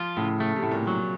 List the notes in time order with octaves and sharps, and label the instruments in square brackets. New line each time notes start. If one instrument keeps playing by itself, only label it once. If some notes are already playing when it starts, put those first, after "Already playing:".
Already playing: [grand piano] F3 [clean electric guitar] F4
[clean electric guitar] A2 [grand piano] C#3
[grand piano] C#3 [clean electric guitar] A3
[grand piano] C3
[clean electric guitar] A2
[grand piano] A#2
[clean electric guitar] F#3